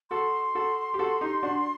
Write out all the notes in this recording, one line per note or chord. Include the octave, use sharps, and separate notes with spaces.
F#4 A4 C6
F#4 A4
G4
F#4 A4
D#4 G4
D4 F#4